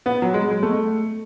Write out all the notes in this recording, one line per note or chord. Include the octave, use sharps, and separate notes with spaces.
B3
F#3
G#3
G#3
A3